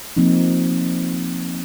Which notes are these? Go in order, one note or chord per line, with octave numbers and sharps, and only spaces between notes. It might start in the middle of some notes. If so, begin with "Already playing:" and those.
F3 A#3 C4 D#4